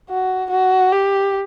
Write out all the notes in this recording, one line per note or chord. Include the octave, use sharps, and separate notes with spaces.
F#4
F#4
G4